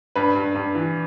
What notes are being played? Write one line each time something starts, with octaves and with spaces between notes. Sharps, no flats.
G2 B4
G2
G2
E3